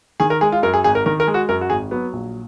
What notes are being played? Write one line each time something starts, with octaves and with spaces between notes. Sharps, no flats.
D#3 G#4
A#4
G#3 G#4
F4
F#2 A#4
G#4
G#1 G#4
A#4
D#3 A#4
A#4
G#3
F#4
F#2 A#4
F#4
G#1 G#4
F#3 B3
A#1